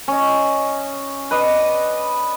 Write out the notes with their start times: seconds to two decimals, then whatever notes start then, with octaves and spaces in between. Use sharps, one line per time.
0.08 C#4 D#5
1.31 B4 D5 D#5